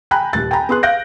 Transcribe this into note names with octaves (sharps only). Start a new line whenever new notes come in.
G5 G#5 A#5 B5 F#6
D#1 A6
G5 G#5 A#5 B5
B3 G#4 C6 F#6
F5 F#6 G6 A#6 D7